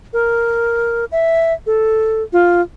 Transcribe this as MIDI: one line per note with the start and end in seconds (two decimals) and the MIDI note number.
0.13 1.05 70
1.12 1.53 76
1.67 2.23 69
2.33 2.61 65